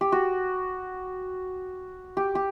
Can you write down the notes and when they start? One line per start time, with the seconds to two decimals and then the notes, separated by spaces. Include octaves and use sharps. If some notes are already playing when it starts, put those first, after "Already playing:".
0.01 G4
0.12 F#4
2.17 G4
2.35 G4